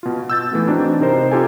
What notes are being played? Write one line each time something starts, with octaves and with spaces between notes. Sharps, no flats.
B2 F4
E6 G6 A6
E3 A3 B3
C4 D4 D#4 F#4
C3 D#4 A#4 C5
D#4 F4 G4 A4 G#5